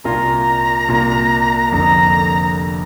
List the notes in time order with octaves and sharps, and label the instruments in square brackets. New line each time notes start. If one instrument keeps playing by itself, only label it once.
[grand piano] C2 A#2 A#3 F4 [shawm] A#5
[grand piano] C2 A#2 A#3 F4
[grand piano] F1 F2 D3 A#3 [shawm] A#5